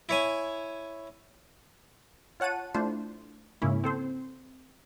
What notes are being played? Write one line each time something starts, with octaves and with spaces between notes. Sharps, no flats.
E4 C#5 G#5
F4 C#5 F#5 A5 D#7
A3 D4 E4 F4 C5
G#2 C#3 A#3 C#4 E4
C4 A4 C5